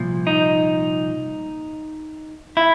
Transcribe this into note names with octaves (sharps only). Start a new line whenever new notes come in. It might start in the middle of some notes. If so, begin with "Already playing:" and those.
Already playing: C2 A#2 F3
D#4
E4